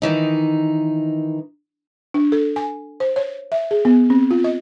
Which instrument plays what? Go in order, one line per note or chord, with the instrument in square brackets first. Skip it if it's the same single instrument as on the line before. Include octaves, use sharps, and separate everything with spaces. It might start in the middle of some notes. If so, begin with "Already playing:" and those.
[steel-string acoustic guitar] D#3 E3 D#4
[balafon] D4
A4
G#5
C5
C#5
E5
G#4
B3
C4
F4
D#5